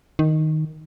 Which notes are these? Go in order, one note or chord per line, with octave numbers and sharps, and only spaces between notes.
D#3